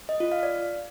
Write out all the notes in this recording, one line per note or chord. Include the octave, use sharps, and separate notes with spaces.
D#5
F4
F5
D5